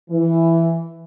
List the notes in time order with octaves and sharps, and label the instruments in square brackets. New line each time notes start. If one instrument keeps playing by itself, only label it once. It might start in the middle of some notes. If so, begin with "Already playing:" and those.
[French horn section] E3